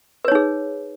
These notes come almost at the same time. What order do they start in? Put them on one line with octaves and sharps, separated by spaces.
B4 C#5 D#4 G#4